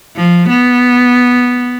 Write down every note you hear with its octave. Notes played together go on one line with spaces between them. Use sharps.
F3
B3